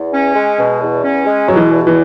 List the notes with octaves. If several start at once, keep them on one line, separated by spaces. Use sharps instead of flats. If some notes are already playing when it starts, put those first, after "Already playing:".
Already playing: E2
C#4
G#3
B2
E2
C#4
G#3
B2 F#3
E3
E2
E3